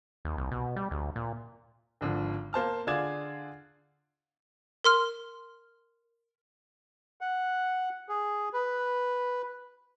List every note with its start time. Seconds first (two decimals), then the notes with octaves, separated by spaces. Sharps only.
0.25 D#2
0.37 C2
0.51 B2
0.76 G3
0.91 D2
1.16 A#2
2.01 G#1 D3 F3
2.53 A#3 C5 A5 F6
2.87 D3 F4 G#4 D5 G#6 E7
4.84 A#4 C6 F6
7.21 F#5
8.09 G#4
8.54 B4